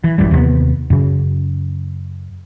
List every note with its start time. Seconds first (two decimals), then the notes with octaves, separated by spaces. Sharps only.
0.04 E3
0.18 G#1 F#2 E3 G3
0.31 D#2 C3 A#3 B3
0.90 F#2 C#3